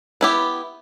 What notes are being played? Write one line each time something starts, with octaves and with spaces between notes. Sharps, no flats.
B3 E4 G4